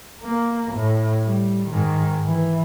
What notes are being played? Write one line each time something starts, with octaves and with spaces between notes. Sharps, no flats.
A#3
A2
G3
G#2 D#3
E3